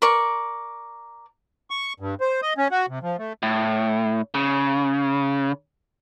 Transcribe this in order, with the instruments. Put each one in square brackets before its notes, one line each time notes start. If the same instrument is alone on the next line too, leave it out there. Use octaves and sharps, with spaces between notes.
[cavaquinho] A#4 D5 C#6
[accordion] C#6
G2
C5
D#5
C#4
F#4
C3
F3
A3
[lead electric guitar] A2
C#3